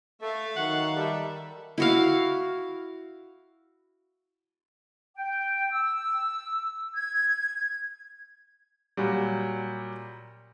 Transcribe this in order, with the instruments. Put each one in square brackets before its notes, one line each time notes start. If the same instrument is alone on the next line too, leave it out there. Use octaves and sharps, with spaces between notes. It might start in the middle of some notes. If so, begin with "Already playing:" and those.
[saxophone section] A3 [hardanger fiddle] E5 F5
[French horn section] D#3 [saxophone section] F#3 F#4 F#5
[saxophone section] G3 [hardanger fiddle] A4 E5
[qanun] E4 F#4 F5
[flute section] G5
E6
G#6
[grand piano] A#2 F#3 G3